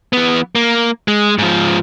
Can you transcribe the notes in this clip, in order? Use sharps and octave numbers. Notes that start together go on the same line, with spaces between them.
E3 B3
A#3
G#3
G#2 F3